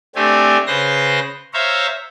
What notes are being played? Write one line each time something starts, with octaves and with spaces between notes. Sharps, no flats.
A3 C4 D4 G4 G#5
C#3 B4 C5 C6 A#6
C5 C#5 E5 F5 A#5